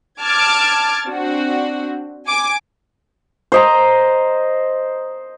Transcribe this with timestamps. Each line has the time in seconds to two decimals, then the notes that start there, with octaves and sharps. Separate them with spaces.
0.22 A5 D6 F6 G#6 A6
1.05 C4 D4 F#4
2.26 G#5 D6
3.52 C5 D#5 A#5